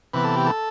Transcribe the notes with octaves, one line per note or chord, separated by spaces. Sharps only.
C3 E3 B3 B4
A4
G4
A4